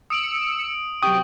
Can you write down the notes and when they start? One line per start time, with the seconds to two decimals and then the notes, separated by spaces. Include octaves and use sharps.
0.10 D#6 E6 C#7 D7 F#7
1.03 C3 F#3 G5 C#6 D#6